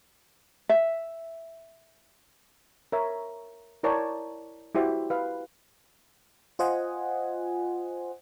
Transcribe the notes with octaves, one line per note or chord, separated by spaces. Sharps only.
E5
A#4 C#5 E5
E4 A#4 C#5 D5 G5 A5
E4 F#4 G4 C5 E5
B4 F5
F4 C5 D#5 F#5 G#5